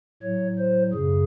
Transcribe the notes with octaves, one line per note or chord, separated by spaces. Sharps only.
A2 F#3 C#5
C5
F#2 C#3 G#4